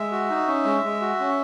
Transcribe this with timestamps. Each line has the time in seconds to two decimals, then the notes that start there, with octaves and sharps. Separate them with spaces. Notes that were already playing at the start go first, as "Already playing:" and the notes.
Already playing: G#3 E5
0.12 F#4
0.30 D#4
0.47 C#4
0.65 G#3
0.84 G#3
1.01 F#4
1.20 C#4